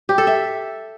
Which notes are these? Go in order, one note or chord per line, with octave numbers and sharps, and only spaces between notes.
G4
A4
E5